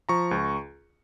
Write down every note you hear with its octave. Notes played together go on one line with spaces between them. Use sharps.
F3 A#5 C#6
C#2